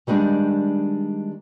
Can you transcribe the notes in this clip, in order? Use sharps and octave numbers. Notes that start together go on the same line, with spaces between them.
D#3 G3 G#3 D4 D#4